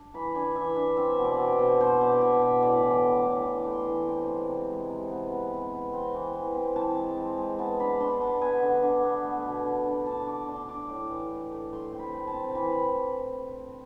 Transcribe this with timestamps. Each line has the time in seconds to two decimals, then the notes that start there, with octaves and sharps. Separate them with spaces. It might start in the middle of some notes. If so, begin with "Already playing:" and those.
Already playing: D4
0.14 E3 B5
0.35 D4 G#5
0.55 E3 E5
0.76 D4 E5
0.97 C4 E5
1.19 B2
1.24 D5
1.39 B2
1.52 C5
1.59 B2
1.80 B2 C5
2.01 B2 D5
2.21 B2 E5
2.42 B2 E5
2.62 A2 D5
2.83 E3
2.91 C6
3.03 A2
3.18 D6
3.25 A2
3.45 E3 D6
3.66 A3
3.72 C6
3.87 E3
4.08 C4
4.28 G#3
4.48 C3
4.70 G#3
4.89 C3
5.11 B3
5.31 B3
5.52 C3
5.73 B3
5.93 C4 C6
6.14 E3
6.35 E3
6.55 C4
6.76 E3 A5
6.97 G#3
7.17 C4
7.38 G#3
7.59 B3 A5
7.80 D4 B5
8.00 D4 C6
8.20 B3 A5
8.41 B3 G#5
8.63 D3
8.83 D4
9.03 B3
9.24 A3
9.44 B2
9.65 D4
9.85 D4
10.06 D4 A5
10.27 D4 D6
10.48 D4 C6
10.69 D4 D6
10.89 A2
11.10 E3
11.31 A3
11.52 A3
11.72 A3 C6
11.92 C4
11.99 B5
12.13 A3
12.27 A5
12.34 C4
12.55 E3 B5